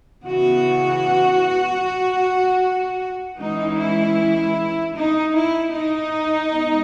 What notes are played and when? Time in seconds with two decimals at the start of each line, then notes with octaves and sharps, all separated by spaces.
0.25 C#3 E3 B3 F#4
3.38 E3 G#3 C#4 D#4
3.78 E4
4.94 D#4
5.34 E4
5.72 D#4
6.51 G#3 B3